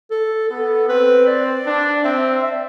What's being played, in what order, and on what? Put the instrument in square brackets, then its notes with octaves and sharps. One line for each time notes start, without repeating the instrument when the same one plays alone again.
[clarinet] A4
[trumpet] B3 [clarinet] A4
[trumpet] C4 [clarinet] B4
[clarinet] D5
[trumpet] D4
[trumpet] C4 [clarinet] E5
[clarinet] E5
D5